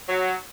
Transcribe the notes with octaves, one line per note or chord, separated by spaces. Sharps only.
F#3